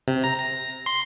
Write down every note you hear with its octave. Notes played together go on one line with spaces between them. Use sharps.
C3
A#5
A#6
C6